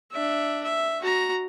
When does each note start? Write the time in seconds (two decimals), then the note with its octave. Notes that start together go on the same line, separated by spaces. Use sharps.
0.12 D4 E5
0.64 E5
1.01 F#4 A#5